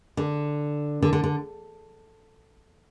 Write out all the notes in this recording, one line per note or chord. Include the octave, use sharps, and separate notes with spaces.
D3
D3
D3
D3